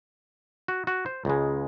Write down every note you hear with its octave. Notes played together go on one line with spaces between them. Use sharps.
F#4
F#4
C5
C#2 C#3 G#3